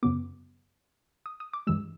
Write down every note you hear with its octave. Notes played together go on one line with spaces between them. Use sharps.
F#2 C#3 F#3 B3 D6
D#6
D#6
D6
G2 E3 G#3 E6